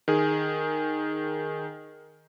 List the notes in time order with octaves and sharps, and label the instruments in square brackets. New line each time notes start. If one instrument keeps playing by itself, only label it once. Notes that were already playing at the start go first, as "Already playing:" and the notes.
[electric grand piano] D#3 G#4